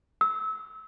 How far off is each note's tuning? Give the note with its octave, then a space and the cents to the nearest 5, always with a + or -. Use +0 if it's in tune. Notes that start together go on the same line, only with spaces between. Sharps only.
E6 -30